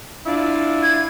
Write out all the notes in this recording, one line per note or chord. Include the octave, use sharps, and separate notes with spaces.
D4 E4 F4
G#6